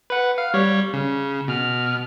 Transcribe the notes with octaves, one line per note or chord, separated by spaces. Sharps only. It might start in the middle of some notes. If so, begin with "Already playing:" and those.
B4 F#5
F5
G3 C#5
C#3
B2 F6